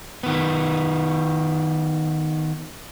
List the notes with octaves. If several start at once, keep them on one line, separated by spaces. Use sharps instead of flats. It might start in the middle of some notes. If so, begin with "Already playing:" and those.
D#3 B3